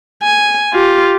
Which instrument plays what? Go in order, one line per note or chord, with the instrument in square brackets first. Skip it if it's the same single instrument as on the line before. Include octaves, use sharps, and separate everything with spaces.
[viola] G#5
F4 G4